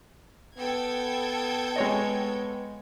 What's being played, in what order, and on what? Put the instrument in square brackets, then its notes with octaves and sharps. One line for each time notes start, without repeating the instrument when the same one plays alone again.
[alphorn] B3 [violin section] A4 G5 G#6
[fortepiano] G#3 C#5 D#5